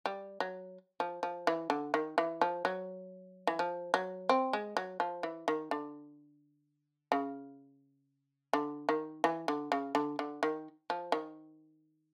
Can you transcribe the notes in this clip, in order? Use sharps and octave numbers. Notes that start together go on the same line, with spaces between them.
G3
F#3
F3
F3
E3
D3
D#3
E3
F3
F#3
E3
F3
F#3
C4
G#3
F#3
F3
E3
D#3
D3
C#3
D3
D#3
E3
D3
C#3
D3
D3
D#3
F3
D#3